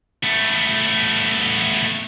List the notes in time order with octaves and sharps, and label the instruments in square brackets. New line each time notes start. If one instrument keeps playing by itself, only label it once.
[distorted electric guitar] A3 B3